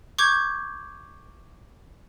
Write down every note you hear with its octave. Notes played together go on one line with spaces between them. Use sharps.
C#6 D6 G6 G#6